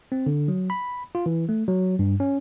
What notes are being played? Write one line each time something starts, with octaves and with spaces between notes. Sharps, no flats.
C4
D3
F#3
B5
F4
E3
A3
F#3
G2
C#4